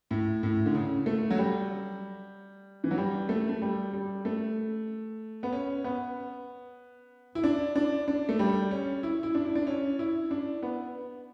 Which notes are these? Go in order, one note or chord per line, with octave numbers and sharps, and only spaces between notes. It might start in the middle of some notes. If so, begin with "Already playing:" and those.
A2
A2
D3
C#3
A3
F#3
G3
E3
F#3
G3
A3
A3
G3
G3
A3
B3
C#4
B3
E4
D4
D4
D4
A3
G3
C#4
E4
E4
D4
E4
D4
C#4
E4
D4
B3